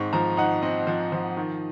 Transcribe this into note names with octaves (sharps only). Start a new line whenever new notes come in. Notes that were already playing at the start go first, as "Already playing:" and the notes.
Already playing: G#2 C4 D#4 C#6
F3 A#5
D#4 F#5
C4 D#5
F3
F3
D#3